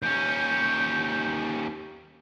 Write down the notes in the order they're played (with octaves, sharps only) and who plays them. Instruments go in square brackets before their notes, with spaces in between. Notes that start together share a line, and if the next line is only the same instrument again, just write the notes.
[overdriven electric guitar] D#2 C#4 [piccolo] G6